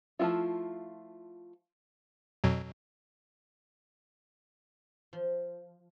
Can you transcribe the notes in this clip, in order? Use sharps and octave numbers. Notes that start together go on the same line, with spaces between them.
F3 A3 C4 E4 F4
F2 B2 F#3
F3